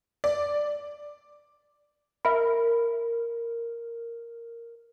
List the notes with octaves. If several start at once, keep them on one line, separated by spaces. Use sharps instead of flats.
D5
A#4 E5 B5